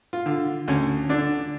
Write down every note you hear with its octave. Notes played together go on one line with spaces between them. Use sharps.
F4
D3
D2 C#4
D3 D4